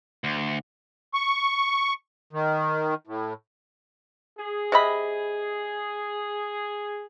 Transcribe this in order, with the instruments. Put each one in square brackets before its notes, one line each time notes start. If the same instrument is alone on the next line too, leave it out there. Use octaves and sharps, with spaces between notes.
[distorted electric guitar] D2
[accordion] C#6
D#3
A2
[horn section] G#4
[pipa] C3 D#5 B5